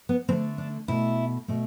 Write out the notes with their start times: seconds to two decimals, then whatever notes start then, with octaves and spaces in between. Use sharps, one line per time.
0.09 B3
0.29 D3 A3 C4
0.58 D4
0.88 B2 A3 E4
1.48 B2 A3